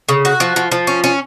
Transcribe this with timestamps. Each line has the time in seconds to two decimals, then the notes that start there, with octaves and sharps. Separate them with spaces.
0.09 C#3
0.25 F#4
0.40 F3
0.56 F3
0.72 F3
0.87 C#4
1.04 C#4